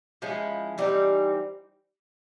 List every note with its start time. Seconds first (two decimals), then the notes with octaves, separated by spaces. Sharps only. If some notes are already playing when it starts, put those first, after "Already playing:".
0.22 F3 G#3 C#4 E4
0.78 E3 G3 C4 D#4